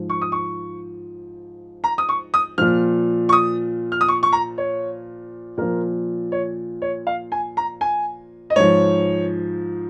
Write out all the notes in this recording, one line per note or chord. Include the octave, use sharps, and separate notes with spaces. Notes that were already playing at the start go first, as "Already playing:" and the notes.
Already playing: G#2 F3
C#6
D#6
C#6
A#5
D#6
C#6
D#6
A#2 F3 F6
C#6
D#6
F6
D#6
C#6
C#6
A#5
C#5
A#2 F3 A#4
C#5
C#5
F5
G#5
A#5
G#5
D#5
G#2 F3 C#5